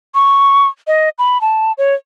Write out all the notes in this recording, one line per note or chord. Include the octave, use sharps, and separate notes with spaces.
C#6
D#5
B5
A5
C#5